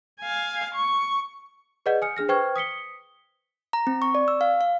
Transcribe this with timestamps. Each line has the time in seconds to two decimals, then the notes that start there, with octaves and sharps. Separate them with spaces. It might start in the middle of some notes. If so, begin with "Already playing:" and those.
0.21 F5 G#5
0.75 C#6
1.86 G#4 B4 D5 D#5 F#5 G6
2.02 G#5 D#6 F6 C#7
2.16 D4 G#4 F6 A#6
2.29 B4 C5 G5 C#6 F6 G#6
2.56 D#6 B6 C#7 G7
3.73 A#5
3.87 C4
4.02 C#6
4.15 D5
4.28 E6
4.41 F5
4.61 F5